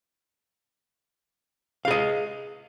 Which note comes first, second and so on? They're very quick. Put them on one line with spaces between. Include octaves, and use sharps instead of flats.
F5 G#4 D#5